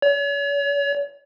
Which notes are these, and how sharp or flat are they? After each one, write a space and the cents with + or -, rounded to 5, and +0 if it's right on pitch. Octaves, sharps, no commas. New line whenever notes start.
C#5 +40